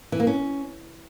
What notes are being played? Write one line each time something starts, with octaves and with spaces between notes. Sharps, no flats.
E3
A#3
C#4